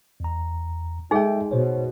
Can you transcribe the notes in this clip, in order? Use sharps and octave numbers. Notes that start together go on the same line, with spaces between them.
E2 A#5
G#3 D#4 G#4 A4 E5 G5
B2 C5 C#5